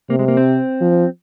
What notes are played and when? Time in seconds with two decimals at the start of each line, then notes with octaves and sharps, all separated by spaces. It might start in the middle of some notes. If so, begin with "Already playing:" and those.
0.10 C3 A#3
0.19 G#3
0.28 A#3
0.37 C4
0.81 F3